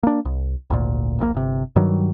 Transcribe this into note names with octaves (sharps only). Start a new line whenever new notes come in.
A#3 D4
C2
G#1 D2 A#2
D#1 A#1 B2 A#3
G1 C3
G2 D#3 F#3 G3